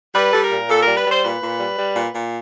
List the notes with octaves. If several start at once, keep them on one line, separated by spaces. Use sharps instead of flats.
G3 B4
G3 A4
A#4
A#2
A#2 A4
G3 A#4
B4
G3 C5
A#2 B4
A#2
G3
G3
A#2
A#2